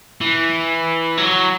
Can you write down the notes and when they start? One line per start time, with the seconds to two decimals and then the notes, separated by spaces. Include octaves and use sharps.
0.21 E3
1.18 F#3